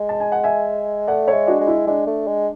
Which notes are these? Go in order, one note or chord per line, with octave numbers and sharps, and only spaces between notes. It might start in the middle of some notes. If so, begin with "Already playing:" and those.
Already playing: G#3
A5
G#5
F#5
E5 G#5
A3 D5 F#5
C#5 E5
G#3
D4 F#4
G#3
E4
G#3 D4
A3
G#3